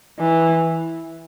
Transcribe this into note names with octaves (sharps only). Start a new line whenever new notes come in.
E3